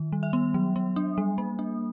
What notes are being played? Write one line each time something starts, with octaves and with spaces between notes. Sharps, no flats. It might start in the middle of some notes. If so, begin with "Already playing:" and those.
Already playing: D#3
G3
E5
B3
F#3
B3
D4
G3
A#3
D4